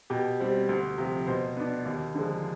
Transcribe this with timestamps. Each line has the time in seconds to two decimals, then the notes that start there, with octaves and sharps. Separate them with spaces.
0.10 B2 G4
0.40 G3 C4
0.69 D2
0.98 C3 F3
1.27 B2 C5
1.56 B3 D4
1.85 D#2
2.15 D3 F3 G#3